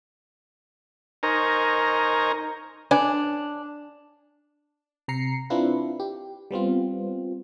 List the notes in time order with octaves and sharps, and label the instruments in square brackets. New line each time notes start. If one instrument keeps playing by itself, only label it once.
[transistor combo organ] D#4 A#4 C5 G#5 A#5 C#6
[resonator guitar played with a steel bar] D4 [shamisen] B4 C#5 G#5
[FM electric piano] C3 A#5 C7 C#7
C4 D4 E4 F4 B4
G4
G3 B3 C4 F4